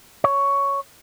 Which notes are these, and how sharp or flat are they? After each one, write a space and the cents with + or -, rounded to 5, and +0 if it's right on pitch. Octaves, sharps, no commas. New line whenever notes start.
C#5 +5